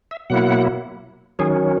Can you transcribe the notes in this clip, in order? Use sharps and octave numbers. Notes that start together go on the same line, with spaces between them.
E5
B2 F#3 A#3 E4 F#5
D#3 F#3 C#4 G#4